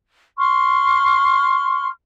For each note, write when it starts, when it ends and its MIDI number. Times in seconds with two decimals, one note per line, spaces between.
0.38 1.86 84
0.38 1.86 85
0.38 1.86 89